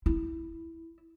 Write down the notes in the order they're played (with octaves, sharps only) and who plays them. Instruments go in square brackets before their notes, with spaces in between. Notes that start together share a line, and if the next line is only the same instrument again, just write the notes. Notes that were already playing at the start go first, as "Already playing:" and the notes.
[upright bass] E4